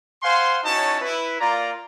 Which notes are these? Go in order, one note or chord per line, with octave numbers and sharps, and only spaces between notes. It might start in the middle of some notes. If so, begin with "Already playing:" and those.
C5 F5 F#5 G#5 C6
C#4 D#4 E4 F#4 C#5 A5
E4 B4
A#3 F4 D5 A#5